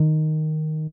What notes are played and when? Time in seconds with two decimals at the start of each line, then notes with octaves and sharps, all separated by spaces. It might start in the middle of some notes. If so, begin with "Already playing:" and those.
Already playing: D#3